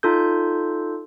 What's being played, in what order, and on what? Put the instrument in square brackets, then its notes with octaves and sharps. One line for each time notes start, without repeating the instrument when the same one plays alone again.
[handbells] D#4 F4 A4 G6